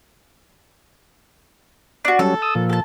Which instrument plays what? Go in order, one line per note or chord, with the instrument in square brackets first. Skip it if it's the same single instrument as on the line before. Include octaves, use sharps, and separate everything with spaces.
[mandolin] D4 F#4
[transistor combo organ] F#3 G3 C#4 [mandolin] A4
[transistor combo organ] D#6 E6
A#2 F3
[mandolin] A4 A5